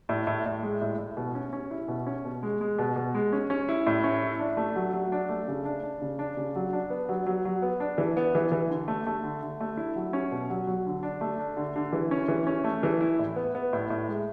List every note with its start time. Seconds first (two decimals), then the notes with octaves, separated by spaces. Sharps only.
0.09 A2
0.27 A2
0.46 A2
0.63 G#3
0.81 A2
0.98 A2
1.17 B2
1.35 C#4
1.53 C#4
1.71 E4
1.88 B2
2.07 C#4
2.25 B2
2.43 G#3
2.61 G#3
2.79 B2
2.96 B2
3.15 G#3
3.33 C#4
3.50 C#4
3.69 E4
3.87 A2
4.04 C#4
4.22 E4
4.39 D4
4.57 A3
4.76 F#3
4.93 F#3
5.12 D4
5.29 A3
5.48 C#3
5.65 D4
5.83 D4
6.02 C#3
6.19 D4
6.37 C#3
6.56 F#3
6.73 D4
6.90 B3
7.09 F#3
7.26 F#3
7.45 F#3
7.62 B3
7.80 D4
7.98 E3
8.17 B3
8.35 E3
8.52 E3
8.70 D3
8.88 A3
9.07 A3
9.23 D3
9.42 D3
9.60 A3
9.77 E4
9.96 F#3
10.13 C#4
10.32 B2
10.50 F#3
10.67 F#3
10.86 D3
11.03 D4
11.21 A3
11.39 D4
11.57 D3
11.76 D3
11.93 E3
12.11 C#4
12.28 E3
12.47 C#4
12.64 A3
12.83 E3
13.01 E4
13.19 A2
13.36 B3
13.55 B3
13.73 A2
13.90 A2
14.08 G#3